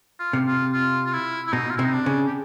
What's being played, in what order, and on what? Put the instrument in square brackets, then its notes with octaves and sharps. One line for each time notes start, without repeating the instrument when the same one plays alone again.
[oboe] F4
[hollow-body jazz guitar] C3
[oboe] F4
F4
F4
E4
E4
[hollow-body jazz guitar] B2 [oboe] D#4
[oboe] F4
[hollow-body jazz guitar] C3 [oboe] E4
[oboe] D#4
D4
[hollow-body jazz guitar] C#3
[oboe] G4